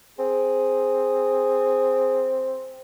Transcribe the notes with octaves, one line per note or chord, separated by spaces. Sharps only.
C4 G#4